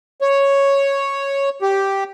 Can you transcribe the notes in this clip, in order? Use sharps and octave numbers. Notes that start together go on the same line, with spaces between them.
C#5
G4